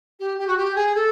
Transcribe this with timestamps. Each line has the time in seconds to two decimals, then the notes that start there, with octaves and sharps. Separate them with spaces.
0.20 G4
0.39 G4
0.47 F#4
0.57 G4
0.75 G#4
0.95 A4